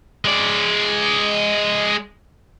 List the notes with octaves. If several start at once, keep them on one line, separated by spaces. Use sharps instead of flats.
G#3 D5